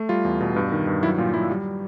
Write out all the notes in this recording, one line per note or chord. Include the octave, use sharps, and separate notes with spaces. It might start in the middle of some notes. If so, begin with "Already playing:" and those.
Already playing: A3
G3 F4
E2
B2
G2
D#3
G2
F#3 E4
A#2 F4
F#3 E4
G3